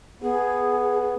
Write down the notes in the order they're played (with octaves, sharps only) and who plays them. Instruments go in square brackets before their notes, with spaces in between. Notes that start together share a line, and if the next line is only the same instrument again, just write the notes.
[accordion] B3 [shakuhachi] G#4